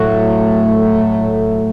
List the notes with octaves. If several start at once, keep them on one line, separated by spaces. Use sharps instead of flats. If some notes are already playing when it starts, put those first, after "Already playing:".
Already playing: A2 F#3 A3 F#4